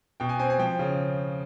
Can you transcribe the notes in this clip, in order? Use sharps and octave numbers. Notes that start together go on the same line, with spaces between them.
B2 G5
G#5
C4 G#5
G#5
F3 G5
C#3